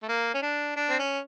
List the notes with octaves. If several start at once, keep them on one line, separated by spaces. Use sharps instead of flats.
A3
A#3
C#4
D4
D4
C4
C#4